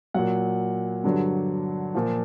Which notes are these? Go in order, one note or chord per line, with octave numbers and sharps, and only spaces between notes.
A#2 F#3 F#5
G2 D3 F#3
A#2 F3